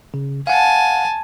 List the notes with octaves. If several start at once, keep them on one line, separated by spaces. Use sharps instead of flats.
C#3
F5 F#5 G#5 A5